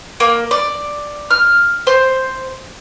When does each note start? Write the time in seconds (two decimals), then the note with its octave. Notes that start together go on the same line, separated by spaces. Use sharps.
0.20 A#3
0.51 D5
1.31 F6
1.87 C5